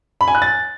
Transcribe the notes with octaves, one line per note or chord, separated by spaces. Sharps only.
B5
G#5
F#6
A6